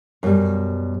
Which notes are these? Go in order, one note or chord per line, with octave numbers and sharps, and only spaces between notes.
F#2 B2 G3